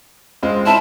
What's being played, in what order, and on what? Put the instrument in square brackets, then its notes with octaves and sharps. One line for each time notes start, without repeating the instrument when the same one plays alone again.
[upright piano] G#3 C4 F4
[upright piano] C4 E4 [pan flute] A5